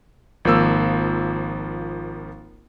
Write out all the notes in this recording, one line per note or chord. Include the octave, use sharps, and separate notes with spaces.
G#1 F3 A#3 E6